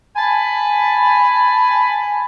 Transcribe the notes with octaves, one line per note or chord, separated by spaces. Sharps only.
G#5 A5 B5